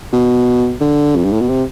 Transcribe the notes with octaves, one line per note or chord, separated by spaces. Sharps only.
B2
D3
F2
G2
A2
B2
C3